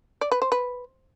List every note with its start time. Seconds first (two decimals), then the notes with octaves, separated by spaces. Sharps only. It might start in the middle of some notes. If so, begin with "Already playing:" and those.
0.21 D5
0.31 B4
0.42 C5
0.52 B4